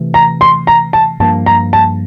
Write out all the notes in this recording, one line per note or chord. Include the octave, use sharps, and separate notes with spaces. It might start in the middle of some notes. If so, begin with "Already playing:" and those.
Already playing: C3 E3 A3
A#5
C6
A#5
A5
G2 F3 A#3 A5
A#5
A5